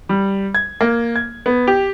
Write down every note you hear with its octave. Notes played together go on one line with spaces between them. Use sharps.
G3
G#6
A#3
G#6
B3
G4